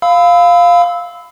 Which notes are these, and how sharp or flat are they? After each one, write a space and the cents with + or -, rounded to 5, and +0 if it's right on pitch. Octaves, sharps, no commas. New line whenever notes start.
F5 +0 B5 +30 E6 -15